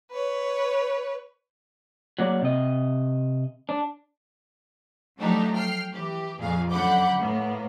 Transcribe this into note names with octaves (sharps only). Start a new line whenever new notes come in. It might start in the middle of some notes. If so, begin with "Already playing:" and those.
B4 C#5
F#3 A#3 D5
C3 D#5
D4
F3 F#3 A3 D4 D#4 G4
G5 F6 C7
E3 G4
F2 A#2 G#4 F5
F#2 D3 F#5 B5 D6 G6
A2 A#3 B3